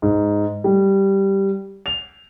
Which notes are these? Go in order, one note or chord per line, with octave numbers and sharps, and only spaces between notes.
G#2
G3
F7